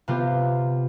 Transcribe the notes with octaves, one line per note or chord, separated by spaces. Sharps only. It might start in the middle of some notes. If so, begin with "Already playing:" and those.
C3 B3 F4 G4